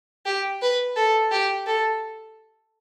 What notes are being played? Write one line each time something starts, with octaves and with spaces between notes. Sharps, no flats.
G4
B4
A4
G4
A4